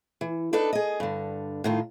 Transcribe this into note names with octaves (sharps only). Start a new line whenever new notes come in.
E3
D4 D#4 A4 B4 D5
G#4 D#5
G2 D3
A2 D#3 F4